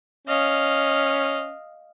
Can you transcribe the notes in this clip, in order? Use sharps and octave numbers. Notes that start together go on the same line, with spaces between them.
C#4 D#5 F5